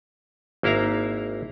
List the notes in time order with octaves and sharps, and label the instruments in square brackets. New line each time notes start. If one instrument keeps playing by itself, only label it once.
[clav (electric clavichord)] G#1 A#3 E4 F5 A#5